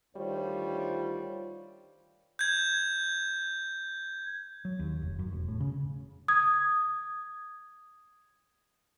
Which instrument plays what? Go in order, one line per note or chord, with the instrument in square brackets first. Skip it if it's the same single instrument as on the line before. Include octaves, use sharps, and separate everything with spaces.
[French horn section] D2 D#3 G3 F4 C5 C#5
[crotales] G6 G#6
[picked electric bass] F#3
D#2
F1
F#2
E1
A2
C#3
[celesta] D#6 G#6